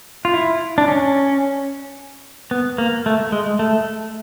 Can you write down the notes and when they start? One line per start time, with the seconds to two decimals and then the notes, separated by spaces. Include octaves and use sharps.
0.25 F4
0.34 E4
0.78 D4
0.88 C#4
2.51 B3
2.78 A#3
3.06 A3
3.32 G#3
3.59 A3